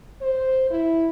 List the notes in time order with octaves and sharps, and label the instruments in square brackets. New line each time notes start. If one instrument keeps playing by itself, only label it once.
[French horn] C5
E4